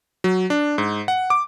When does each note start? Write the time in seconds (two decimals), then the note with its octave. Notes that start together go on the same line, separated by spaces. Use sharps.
0.24 F#3
0.50 D4
0.78 G#2
1.08 F#5
1.30 D6